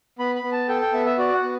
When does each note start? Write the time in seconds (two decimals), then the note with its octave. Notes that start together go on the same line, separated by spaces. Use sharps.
0.19 B3 B5
0.35 B5
0.43 B3
0.52 A5
0.68 A4 G5
0.81 G5
0.93 B3 E5
1.06 E5
1.18 F#4 D5
1.34 F#5
1.43 B3